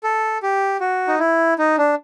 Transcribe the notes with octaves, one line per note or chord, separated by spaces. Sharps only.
A4
G4
F#4
D#4
E4
D#4
D4